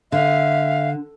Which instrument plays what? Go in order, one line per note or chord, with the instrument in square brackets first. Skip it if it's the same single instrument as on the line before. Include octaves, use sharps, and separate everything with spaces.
[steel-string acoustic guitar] D3 [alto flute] E5 [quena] F5